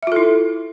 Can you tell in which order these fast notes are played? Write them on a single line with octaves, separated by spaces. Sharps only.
E5 F4 A4 E4